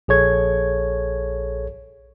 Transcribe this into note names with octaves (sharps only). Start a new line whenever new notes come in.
A#1 G#4 A4 C#5 G#6